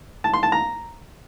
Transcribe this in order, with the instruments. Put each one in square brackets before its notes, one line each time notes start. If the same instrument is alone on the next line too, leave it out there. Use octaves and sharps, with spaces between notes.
[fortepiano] A5
C6
A5
A#5